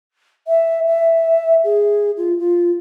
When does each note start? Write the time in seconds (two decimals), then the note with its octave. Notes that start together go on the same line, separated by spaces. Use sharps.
0.48 E5
0.87 E5
1.64 G#4
2.17 F4
2.39 F4